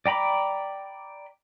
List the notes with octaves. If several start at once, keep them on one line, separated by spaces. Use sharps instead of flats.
D5 G5 A#5 B5 D6